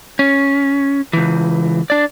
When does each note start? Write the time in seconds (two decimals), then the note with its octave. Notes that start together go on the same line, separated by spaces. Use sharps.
0.19 C#4
1.13 C#2 E3
1.90 D4 D5